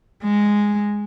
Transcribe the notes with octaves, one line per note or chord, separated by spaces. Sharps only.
G#3